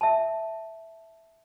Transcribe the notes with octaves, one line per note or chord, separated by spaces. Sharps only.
E5 A5